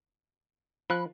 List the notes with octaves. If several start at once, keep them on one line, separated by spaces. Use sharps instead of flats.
F3 B5 F#6